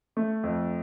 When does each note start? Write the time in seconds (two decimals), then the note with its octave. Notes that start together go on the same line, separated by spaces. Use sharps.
0.17 A3
0.43 F2